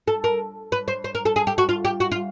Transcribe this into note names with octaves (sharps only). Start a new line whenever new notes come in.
A4
A#4
B4
C5
C5
A#4
A4
G#4
G4
F#4
F4
G4
F#4
F4